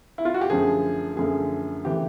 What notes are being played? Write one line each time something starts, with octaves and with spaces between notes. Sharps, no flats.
E4
F4
F#4
G4
F#2 D3 F3 A3 G#4
F#2 D3 F3 A3 G#4
C#3 E3 A3 G4